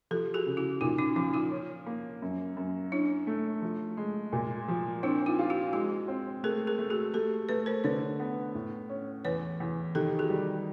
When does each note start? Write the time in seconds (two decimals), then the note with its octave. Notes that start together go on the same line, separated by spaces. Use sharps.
0.11 F3 G4 A4
0.34 F#4 G#4
0.46 C#3
0.57 E4 F#4
0.81 A#2 D#4 F4
0.98 C#4 D#4
1.16 F3 C#4 D#4
1.34 D#4 F4
1.51 C#4
1.86 A#3
2.22 F#2
2.57 F#2
2.92 C#4 D4 E4
3.27 A3
3.62 F3
3.97 G#3
4.33 A#2
4.68 F3
5.03 C4 D4 E4
5.26 D#4 F4
5.39 F4
5.50 E4 F#4
5.73 G#3 E4 F#4
6.08 C4
6.44 A3 G#4 A#4
6.67 G#4 A#4
6.79 A3
6.90 F#4 G#4
7.14 A3 G4 A4
7.49 A3 A4 B4
7.66 A#4 C5
7.84 D3 B4 C#5
8.20 B3
8.55 A2
8.90 C#4
9.25 E2 B4 C#5
9.60 E2
9.95 D#3 G4 A4
10.19 F#4 G#4
10.30 G3